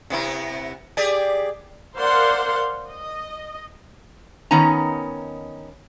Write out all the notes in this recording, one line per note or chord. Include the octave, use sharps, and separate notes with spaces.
C3 B3 E4
G4 G#4 D5
A#4 C5 D5 F5 F#5 C6
D#5
D#3 B3 C#4 D#4 A#5